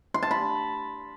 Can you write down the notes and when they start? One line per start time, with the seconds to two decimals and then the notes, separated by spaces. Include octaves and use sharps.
0.14 C6
0.23 A5
0.31 B5